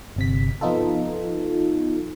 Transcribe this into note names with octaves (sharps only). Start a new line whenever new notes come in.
G1 C3 B6
F3 B3 D#4 F4 A4